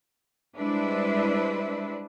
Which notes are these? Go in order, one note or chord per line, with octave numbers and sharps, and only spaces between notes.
G3 G#3 D4 E4 B4 C5